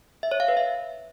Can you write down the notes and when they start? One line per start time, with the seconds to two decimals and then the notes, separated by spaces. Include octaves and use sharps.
0.23 E5
0.31 C#5
0.40 F5
0.48 B4
0.57 E5